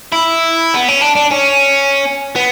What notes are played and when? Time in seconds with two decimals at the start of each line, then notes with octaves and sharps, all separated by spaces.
0.12 E4
0.75 B3
0.89 C#4
1.02 D4
1.16 D4
1.32 C#4
2.36 B3